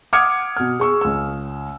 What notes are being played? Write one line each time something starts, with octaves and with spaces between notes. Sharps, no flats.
F#5 D6 D#6 F6 G#6 C#7
B2 F6
G#4 C#6 E6
C#2 E6